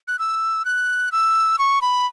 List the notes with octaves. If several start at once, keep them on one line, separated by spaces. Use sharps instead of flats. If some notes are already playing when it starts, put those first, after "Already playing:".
F#6
E6
F#6
E6
C#6
B5